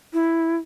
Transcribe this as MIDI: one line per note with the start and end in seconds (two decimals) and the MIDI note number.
0.13 0.56 64